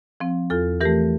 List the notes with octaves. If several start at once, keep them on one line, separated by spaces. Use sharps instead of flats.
F3 C4
E2 F4 A4
E3 A3 G4 A#4